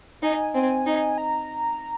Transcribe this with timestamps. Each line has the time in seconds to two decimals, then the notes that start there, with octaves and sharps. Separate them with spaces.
0.23 D#4 G#5
0.33 G#5
0.54 C4 G#5
0.87 D#4
1.18 A#5